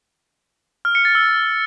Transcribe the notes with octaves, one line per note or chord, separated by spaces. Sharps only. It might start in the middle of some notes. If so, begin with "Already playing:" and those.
F6
C#7
A6
E6